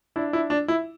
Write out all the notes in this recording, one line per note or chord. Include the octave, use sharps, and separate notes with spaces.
D4 E4
E4
D4
E4